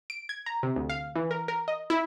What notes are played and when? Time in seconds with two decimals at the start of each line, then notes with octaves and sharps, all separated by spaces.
0.10 D7
0.29 G#6
0.46 A#5
0.63 C3
0.76 D2
0.90 F5
1.15 E3
1.31 A#4
1.48 A#4
1.68 D#5
1.90 E4